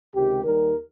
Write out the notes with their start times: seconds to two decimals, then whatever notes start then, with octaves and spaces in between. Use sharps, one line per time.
0.14 C#2 C3 D#3 G#3 G4
0.44 D#2 D#3 G3 A#4